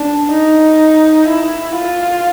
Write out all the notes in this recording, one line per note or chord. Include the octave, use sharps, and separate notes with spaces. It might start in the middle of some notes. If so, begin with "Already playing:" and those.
Already playing: D4
D#4
E4
F4